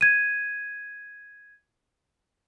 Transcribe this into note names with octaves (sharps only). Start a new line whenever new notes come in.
G#6 D#7